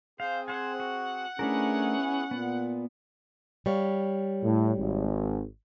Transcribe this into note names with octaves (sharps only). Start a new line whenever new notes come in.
C4 G#4 C5 F5
C5 F#5 G#5
F#4
A3 B3 C#4 D4 E4 G#4 A#4
A#2 B3
G3 C#5 F5
A2
G#1